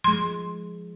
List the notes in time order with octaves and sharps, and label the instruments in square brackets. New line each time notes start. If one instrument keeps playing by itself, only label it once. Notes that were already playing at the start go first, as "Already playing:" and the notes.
[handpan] F3 G#3 [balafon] C6